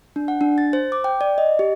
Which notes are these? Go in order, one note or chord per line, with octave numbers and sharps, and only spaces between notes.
D4
F#5
D4
A6
C5
D6
G5
D5
D#5
G4